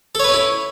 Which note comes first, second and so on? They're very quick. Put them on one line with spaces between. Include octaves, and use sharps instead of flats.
A4 C#5 B4 C#4 E4